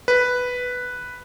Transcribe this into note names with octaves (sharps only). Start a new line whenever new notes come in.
B4